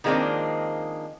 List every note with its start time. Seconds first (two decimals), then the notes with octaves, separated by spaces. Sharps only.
0.04 D#3 F3 G#3 A#3 C4 D4